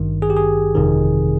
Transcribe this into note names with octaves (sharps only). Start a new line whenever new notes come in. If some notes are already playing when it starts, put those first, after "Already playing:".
Already playing: G#1 G2 D#3
G#4
G4
G#4
G1 F2 C3 D#3